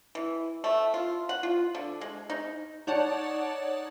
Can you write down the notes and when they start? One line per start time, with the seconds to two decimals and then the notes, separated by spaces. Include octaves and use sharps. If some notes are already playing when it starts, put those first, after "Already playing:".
0.15 E3
0.64 A3
0.94 F4
1.29 F#5
1.43 F4
1.75 D3
2.01 G#3
2.30 D#4
2.87 D#4 C#5 D5 F#5 A5